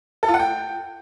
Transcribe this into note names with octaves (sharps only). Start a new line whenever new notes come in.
A4
F4
F#5
G5